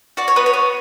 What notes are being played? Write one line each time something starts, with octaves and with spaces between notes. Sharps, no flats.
F#4 D5
C#5
B3 B4
C#5
B3